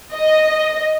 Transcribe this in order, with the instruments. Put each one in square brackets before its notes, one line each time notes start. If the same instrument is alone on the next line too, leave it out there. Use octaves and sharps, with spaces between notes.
[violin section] D#5